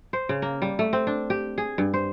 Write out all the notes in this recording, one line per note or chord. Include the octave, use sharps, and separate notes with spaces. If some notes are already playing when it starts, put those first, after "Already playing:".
C5
C#3
A#3
G3
A3
C4
D4
G4
G#4
G2
C5